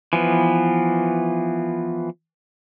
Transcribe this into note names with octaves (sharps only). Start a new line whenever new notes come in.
E3 F3 B3